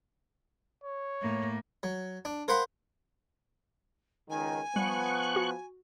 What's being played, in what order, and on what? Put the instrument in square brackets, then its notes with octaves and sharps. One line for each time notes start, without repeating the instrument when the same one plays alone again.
[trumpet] C#5
[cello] A2 A#3
[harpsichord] F#3
D4
A#4 C5 F5 F#5 B5 C6
[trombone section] C#2 D#3 [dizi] G#5
[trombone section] F3 B3 [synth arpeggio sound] G3 [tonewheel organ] C#6 F#6
[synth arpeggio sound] F#4